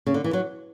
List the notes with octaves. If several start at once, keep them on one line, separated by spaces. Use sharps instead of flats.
C#3
D3
E3
F#3